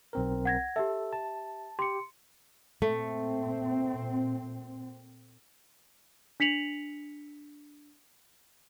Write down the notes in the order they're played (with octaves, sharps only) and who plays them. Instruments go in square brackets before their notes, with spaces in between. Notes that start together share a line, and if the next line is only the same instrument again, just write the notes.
[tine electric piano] B1 C4 A#4
[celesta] F#5 G#6 A#6
[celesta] G4 E5 [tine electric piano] A4
[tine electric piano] A5
[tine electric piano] G4 [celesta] C6 C#7
[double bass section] A#2 C4 [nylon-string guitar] A3
[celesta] D4 B6 C#7 F7 F#7